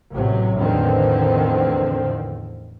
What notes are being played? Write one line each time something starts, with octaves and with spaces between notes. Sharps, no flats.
A1 C3 F#3
A1 E2 D3 D#3 F3 C4